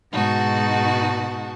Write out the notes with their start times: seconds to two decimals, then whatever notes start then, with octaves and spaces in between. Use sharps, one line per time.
0.13 G#2 B2 G#3 D#4 F#4 A5